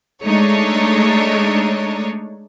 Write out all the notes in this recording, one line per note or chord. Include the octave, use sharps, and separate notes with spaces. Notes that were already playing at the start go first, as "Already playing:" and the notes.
G#3 A3 D4 D#4 C#5